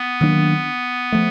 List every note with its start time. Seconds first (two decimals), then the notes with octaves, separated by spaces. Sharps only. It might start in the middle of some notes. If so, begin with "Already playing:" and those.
Already playing: B3
0.21 D#3 F#3 A#3 D4
1.13 F3 A3